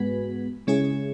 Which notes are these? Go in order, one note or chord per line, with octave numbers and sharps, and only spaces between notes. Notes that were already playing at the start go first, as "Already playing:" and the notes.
Already playing: G#2 G#3 B3 F#4 B4
C#3 G#3 C#4 E4 G#4